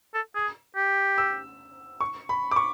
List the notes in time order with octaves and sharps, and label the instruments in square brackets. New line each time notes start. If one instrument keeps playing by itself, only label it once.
[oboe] A4
G#4
G4
[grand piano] E6
C#6
B5
D6
C#6